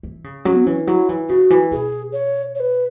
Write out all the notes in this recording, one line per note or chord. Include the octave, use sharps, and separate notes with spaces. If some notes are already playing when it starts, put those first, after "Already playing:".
E3
C#3
F#3 C#4
B3
E3 C#4
F#3 E4
E3
C#3 F#4
E3
B2 G#4
C#5
C#5
B4